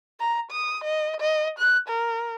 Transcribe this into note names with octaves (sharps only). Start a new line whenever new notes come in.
A#5
D#6
D#5
D#5
F#6
A#4